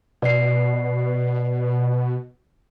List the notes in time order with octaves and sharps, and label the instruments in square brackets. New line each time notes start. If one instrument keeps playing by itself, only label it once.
[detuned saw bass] B2 [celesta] D5 C7